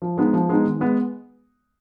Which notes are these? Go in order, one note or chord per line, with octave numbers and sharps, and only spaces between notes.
F3
G#3 B3 D#4
F3
G#3 B3 D#4
D#3
G#3 B3